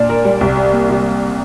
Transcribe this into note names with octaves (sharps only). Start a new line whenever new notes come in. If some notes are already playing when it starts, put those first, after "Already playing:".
Already playing: A#2 D4
A#4
G3
C2
G3
A#3
C3